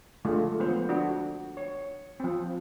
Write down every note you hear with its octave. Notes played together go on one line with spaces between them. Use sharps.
D3 F3 G#3 A3 F4
D3 F3 B3 C5
D4 F#4
C#5
F3 C4